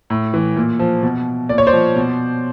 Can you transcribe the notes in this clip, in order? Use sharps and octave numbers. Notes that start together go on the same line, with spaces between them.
A2
E3
A#2
F3
B2
A#2 D5
C#5
C5 D5
F3
B2